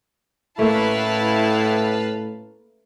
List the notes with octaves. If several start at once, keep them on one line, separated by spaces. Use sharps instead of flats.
A2 A3 A#3 C#4 E4 B4 F5 A5